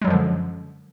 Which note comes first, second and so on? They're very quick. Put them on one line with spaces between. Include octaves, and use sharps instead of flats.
G#3 F#3 F#2 F3 D3